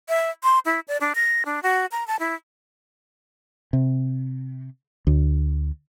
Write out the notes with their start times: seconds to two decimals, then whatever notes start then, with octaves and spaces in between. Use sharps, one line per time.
0.09 E5
0.43 C6
0.65 E4
0.88 D5
1.01 D4
1.15 A#6
1.45 D4
1.63 F#4
1.91 A#5
2.07 A5
2.19 E4
3.73 C3
5.07 D2